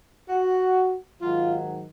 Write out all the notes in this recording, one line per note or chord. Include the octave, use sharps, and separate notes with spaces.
F#4
G#2 D#3 F#3 F4